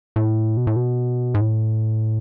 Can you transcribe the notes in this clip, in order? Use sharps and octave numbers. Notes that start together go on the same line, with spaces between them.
A2
B2
A2
B2
G#2
A2